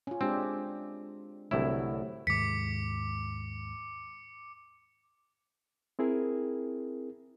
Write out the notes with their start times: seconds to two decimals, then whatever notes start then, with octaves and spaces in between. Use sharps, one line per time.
0.07 C#4 F4
0.21 G#3 C4 D4 G4
1.51 C2 A2 D3 F#3 A3 E4
2.27 D#2 G#2 D6 B6 C#7
5.99 C4 E4 G#4 A#4